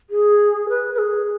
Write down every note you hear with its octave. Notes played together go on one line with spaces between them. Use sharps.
G#4
B4
B4
G#4